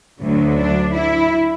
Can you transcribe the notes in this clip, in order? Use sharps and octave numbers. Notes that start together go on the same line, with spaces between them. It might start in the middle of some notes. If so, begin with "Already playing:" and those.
D2 D3 F#3
D4
E4